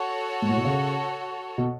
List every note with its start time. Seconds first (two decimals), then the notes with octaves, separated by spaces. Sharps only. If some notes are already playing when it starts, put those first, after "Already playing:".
Already playing: F#4 A4 C#5
0.42 G#2
0.49 A2
0.57 B2
0.65 C#3
1.58 B2